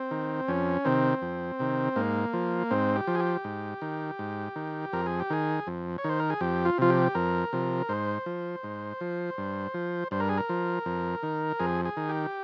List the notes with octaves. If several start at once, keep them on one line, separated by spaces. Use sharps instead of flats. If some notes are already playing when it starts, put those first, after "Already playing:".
Already playing: C4
D#3
F2 C#4
C3 D#3 C4
F2
C3 D#3
G#2 A#3
F3
G#2 C4
G4
F3
G#4
G4
G#2
D#3
G#2
D#3
F2 A#4
G#4
G4
D#3 G#4
F2
C#5
D#3 C5
A#4
G#4
F2 G4
F4
C3 F3 F4
G4
F2 A#4
C3 F3
G#2 C5
F3
G#2
F3
G2
F3
G2 C5
A#4
G#4
A#4
F3
F2
D#3
F2 G#4
G#4
D#3
G4